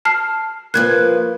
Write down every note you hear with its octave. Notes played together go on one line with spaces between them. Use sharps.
A5 F6 C7
F3 A#3 B4 F#6 G#6